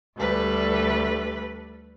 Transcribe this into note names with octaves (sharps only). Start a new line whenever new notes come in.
D2 G3 A4 B4